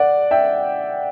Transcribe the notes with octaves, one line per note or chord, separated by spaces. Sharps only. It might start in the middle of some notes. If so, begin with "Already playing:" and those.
Already playing: D5 F#5
E5 G5